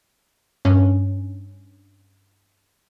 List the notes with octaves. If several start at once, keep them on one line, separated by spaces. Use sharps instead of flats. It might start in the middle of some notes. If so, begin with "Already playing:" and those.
G2 C#4